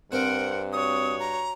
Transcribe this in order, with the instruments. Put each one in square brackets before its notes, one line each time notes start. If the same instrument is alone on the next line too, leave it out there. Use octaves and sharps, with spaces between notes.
[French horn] G2 [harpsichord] C4 [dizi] A#4 [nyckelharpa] F#5
[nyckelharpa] F#4 C#5 [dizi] D#6
[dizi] A#5